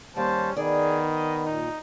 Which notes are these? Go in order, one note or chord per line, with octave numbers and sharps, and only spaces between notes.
D#2 G3 C#4 C5 A5
D#3 B3 G#4 D5
D#5
A#2 D#4